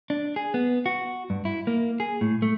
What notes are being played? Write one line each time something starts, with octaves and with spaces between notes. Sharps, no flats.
D4
G#4
B3
F#4
G2
E4
A#3
G#4
A2
A3